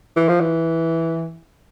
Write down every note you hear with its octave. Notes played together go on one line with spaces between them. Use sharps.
E3
F3
E3